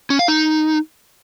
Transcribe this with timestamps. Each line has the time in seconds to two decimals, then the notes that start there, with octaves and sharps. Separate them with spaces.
0.10 C#4
0.19 F5
0.28 D#4